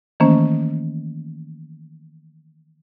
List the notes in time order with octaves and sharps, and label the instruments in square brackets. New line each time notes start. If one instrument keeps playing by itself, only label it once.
[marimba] D#3 E3 A3 A#3 C#4 C5